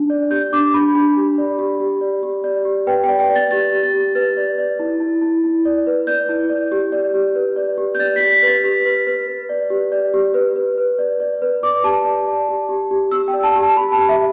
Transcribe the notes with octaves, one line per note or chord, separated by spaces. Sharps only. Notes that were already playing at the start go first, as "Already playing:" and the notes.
Already playing: D4
D5
G4 G6
D4 D6
D4 B5
D4 B5
G4
D5
G4
G4
D5
G4
D5
G4
B4 G5
D5 G5
G5
D5
A6
G4 A6
G4
A6
G4
B4 A6
D5
D5
E4
E4
E4
E4
D5
B4
D5 G6
E4
D5
G4
D5
G4
B4
D5
G4
G6
D5 A6
G4 B6
B6
B4 A6
G4 B6
B4
B4
B4
D5
G4
D5
G4
B4
B4
B4
D5
D5
B4
D5 D6
G4 A5
D5
D5
G4
G4
G4
G4 E6
G5
D5
A5
G4
A5
G4 B5
A5
G4
E5